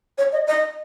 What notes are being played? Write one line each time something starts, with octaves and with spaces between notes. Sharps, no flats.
C#5
D#5
D#5